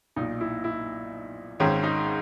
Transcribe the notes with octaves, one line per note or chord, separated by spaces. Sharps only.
B1 A#2 D#4
E4
E4
G#1 G#2 D#3 C#4
D#4